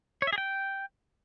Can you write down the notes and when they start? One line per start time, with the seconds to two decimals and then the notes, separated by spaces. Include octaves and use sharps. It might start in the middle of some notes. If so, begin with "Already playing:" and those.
0.22 C#5
0.27 E5
0.33 G#4
0.38 G5